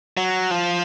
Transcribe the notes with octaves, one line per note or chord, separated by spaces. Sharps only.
F#3
F3